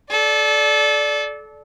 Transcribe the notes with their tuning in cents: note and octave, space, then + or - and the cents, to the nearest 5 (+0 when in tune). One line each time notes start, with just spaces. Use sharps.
A4 -30 D5 +0